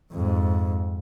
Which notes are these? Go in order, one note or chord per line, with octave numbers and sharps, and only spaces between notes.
F2 G#2